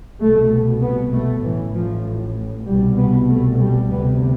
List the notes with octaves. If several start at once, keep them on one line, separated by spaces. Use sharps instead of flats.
C2 B2 A3
B3
A3
A1 A2 E3
F3
C2 B2 G3
B3
A3
G3
D2 C3 B3